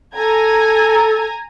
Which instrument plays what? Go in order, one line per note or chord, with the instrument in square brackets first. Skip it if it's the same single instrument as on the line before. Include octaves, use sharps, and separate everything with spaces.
[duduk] A4 [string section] G#5 A#5 G#6